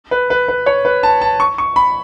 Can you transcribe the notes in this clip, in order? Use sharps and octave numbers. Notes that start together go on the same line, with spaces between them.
B4
B4
B4
C#5
B4
A5
A5
C#6
C#6
B5